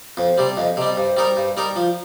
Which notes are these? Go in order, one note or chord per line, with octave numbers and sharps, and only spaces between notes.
F2 C5
C3 G3
F2 D#5
C3 G3 D#5
G2 C5
G3 D#4 A#4
G2
G3 D#4 A#4
F3 F4